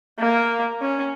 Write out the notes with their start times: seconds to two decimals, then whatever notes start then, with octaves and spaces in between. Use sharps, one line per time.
0.19 A#3
0.81 C#4